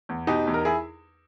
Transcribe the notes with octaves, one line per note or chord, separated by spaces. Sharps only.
E2
B2 D#4 G4
E2
A#4
E4 G#4